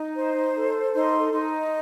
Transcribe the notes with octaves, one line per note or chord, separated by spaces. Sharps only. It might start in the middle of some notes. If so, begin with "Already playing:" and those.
Already playing: D#4
C5
A4
D#4 C6
D#4